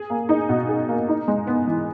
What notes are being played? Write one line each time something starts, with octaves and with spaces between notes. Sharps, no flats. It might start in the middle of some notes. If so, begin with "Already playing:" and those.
Already playing: G#4
A#3
D#4
B2
G#4
A#3
D#4
G#3
B3
E3